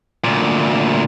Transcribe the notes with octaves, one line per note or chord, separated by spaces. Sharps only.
D2 A#2